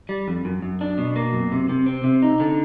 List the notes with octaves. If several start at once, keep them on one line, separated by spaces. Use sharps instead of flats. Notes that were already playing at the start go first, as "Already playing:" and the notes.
G3
F2
F#2
F#2
D4
B2
A#3
F#2
C3
C3
C4
C3
D#4
D3